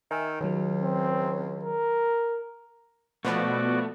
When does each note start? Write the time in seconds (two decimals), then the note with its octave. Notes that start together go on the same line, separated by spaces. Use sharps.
0.11 D#3 E5 G#5 E6
0.41 C#2 D#3 F#3
0.82 C4
1.63 A#4
3.25 B2 F3 A3 B3 F#4 D5